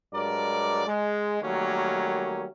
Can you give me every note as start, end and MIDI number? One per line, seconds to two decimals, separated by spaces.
0.13 0.87 43
0.13 0.87 54
0.13 0.87 56
0.13 0.87 70
0.13 0.87 74
0.87 1.39 56
1.42 2.46 51
1.42 2.46 54
1.42 2.46 55
1.42 2.46 57
1.42 2.46 58
1.42 2.46 61